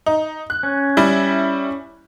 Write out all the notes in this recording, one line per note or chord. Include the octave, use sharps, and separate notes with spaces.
D#4
F#6
C#4
G3 E4